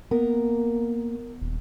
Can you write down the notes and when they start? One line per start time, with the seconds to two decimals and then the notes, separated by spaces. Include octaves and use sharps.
0.11 A#3 B3 A#4
1.41 D#1